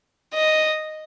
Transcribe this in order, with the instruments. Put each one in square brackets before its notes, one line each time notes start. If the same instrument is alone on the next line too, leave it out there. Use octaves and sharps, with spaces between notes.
[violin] D#5